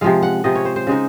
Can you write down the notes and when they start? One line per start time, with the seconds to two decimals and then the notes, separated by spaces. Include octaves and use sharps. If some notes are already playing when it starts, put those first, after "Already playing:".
0.01 C3 F3 G#3 F5
0.23 F#5
0.44 C3 F3 G#3 D#5
0.55 C#5
0.65 C5
0.76 C5
0.87 C#3 G#3 D#4